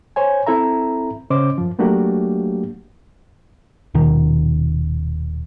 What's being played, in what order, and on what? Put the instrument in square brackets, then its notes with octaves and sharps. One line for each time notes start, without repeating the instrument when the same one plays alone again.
[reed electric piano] C5 C#5 G#5
C4 E4 A4 E5 A#5
C#3 C#4 C5 D#5 D6
F#2 F3
F#3 A3 A#3 D4 F#4 G4
[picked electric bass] D#1 B2 D#3